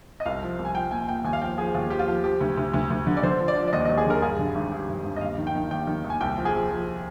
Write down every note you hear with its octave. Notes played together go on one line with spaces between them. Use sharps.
D#5
C2 F5
F3
C2
G#5
F3 G5
A#2 G#5
A#2 G5
D#2 G#5
F5
F3 G5
F3 G#4
D#2 F4
F3 G4
F4
F3
F3 G4
D2
D2
D2
D2
D3
D5
D3 C5
F3
D5
F3
D5
D#2 D#5
D#5
D#2
G#4
D3 A#4
G2 G#4
D3
G#1
G2
G#1
G2
D#5
D#2 F5
D#3
G5
D#3
D#2 G5
D#3
D#2
G#5
C2 G5
F3
G#4
F3
F3